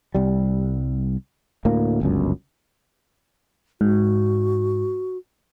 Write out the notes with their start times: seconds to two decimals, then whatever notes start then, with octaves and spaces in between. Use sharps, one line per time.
0.15 C2 G3
1.65 D2 A2 A#3
2.01 G1 C#2 F#2
3.81 G#2 F#4